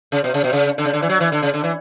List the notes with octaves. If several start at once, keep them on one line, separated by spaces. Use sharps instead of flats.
C#3
B2
C#3
B2
C#3
D3
C#3
D3
E3
F#3
E3
D3
C#3
D3
E3